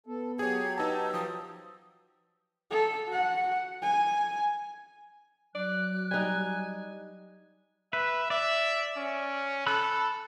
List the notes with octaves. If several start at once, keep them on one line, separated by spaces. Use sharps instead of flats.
B3 A4
F#3 G4 G#4 C#5 G#6
D#4 B4 A5 E6
F3 D#6
A4
F#4 F#5
G#5
F#3 D5 F#6
G3 D#4 G#5
B4 E5
D5 E5
C#4
A4 B5 E6 F#6